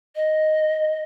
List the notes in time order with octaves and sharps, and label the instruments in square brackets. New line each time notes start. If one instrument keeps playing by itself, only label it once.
[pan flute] D#5